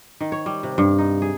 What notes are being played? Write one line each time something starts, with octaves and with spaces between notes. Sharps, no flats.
D#3
C#5
G3
C3
G2
D#4
G#4